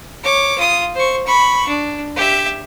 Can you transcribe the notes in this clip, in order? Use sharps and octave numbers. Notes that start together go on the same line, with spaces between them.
C#5 D6
F4 D#6
C5 C#6
B5 C#6
D4
G4 E5